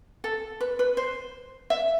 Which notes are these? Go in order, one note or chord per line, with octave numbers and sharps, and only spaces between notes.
A4
B4
B4
C5
E5